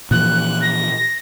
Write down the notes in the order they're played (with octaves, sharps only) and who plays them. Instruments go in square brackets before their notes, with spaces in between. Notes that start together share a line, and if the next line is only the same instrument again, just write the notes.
[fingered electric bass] A#2 E3 F3 [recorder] F#6
[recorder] A#6